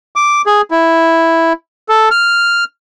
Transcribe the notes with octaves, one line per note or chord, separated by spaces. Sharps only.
D6
G#4
E4
A4
F6